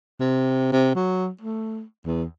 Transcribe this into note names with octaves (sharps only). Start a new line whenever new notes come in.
C3
C3
F#3
A3
E2